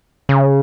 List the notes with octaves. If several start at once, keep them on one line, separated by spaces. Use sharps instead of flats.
C#3